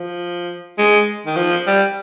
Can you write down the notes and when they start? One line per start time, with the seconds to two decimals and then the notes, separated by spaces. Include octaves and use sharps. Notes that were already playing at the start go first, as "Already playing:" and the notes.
Already playing: F3
0.79 G#3
1.26 D#3
1.36 F3
1.67 G3